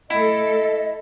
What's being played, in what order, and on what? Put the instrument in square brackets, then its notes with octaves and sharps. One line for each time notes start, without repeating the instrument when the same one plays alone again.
[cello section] A3 A4 [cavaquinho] E4 [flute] D#5